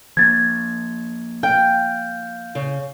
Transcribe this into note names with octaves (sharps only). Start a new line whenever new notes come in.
F3 A#3 G#6 A6
F5 G5 G6
C#3